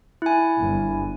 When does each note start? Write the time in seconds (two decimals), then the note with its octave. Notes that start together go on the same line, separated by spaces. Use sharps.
0.22 E4 G#5
0.59 G1